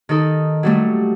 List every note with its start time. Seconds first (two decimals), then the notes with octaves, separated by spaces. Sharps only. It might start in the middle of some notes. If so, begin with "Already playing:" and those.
0.09 D#3 D#4 A4
0.63 F#3 G3 A3